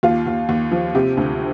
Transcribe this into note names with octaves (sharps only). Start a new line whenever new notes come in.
D#2 F4
D#2
D#2
F3
C3 G4
D2